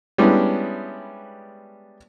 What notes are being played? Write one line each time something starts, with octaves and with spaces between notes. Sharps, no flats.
G3 G#3 B3 C#4 D4 E4